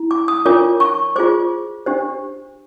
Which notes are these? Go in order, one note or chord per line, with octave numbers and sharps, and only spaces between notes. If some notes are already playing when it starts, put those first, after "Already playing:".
Already playing: E4
D6
D#6
D4 F4 A#4 C#5 D6
C#6
F4 G#4 C5 D6
D4 G4 C5